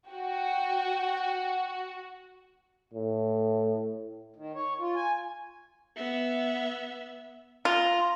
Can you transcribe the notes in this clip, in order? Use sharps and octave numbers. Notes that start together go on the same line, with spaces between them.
F#4 G5
A2
D#3
C#5
F4
G#5
B3 E5
F4 A#5